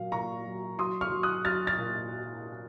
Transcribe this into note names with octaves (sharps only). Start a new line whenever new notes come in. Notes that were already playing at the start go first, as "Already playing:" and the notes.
Already playing: A#2 F#3 F5
A#2 A#5 C#6
F#3
F#3 C6 D#6
C#6 F6
F#3
D#6 F#6
F#3 F6 A6
F6 A6
A#2